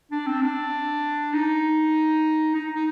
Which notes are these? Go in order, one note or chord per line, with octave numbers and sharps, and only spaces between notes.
D4
C4
D4
D#4
D#4
D#4